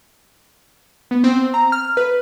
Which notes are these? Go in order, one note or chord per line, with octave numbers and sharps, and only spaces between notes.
B3
C4
A#5
F6
B4